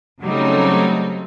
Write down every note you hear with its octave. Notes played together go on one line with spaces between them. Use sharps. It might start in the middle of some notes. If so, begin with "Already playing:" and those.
C#3 F#3 G3 A3 C4 D#4